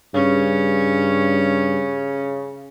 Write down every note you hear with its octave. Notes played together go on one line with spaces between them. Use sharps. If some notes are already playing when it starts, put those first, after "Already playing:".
G2 C#3 C#4